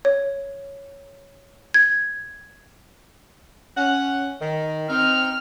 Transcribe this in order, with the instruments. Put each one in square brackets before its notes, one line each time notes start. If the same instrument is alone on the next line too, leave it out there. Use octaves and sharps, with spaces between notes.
[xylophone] C#5
G#6
[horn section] C#4 F#5
D#3
[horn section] C4 D#4 [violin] F6 F7